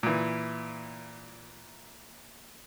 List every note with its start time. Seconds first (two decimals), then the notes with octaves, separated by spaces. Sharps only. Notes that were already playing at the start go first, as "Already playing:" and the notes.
0.03 A#2 E3